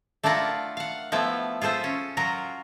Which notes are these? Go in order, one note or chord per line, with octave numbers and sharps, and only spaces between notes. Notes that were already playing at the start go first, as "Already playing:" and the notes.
A3 D4 E4 F4 A#4 F#5
F5 F#5
F3 A3 B3 E4
F4 G#4 A4 C5 E5
C#4
F#3 F4 A#4 A#5